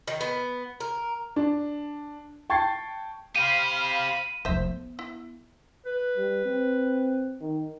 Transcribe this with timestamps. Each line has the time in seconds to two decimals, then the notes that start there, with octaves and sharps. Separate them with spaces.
0.08 D#3
0.21 B3
0.80 A#4
1.36 D4
2.50 G5 A5 C#6 G#6 A6 C7
3.36 G4 C5 F5 B5 D#7
4.45 F1 F3 C5 E5
4.64 B3
4.99 E4
5.86 B4
6.17 G3
6.45 C4
7.41 D#3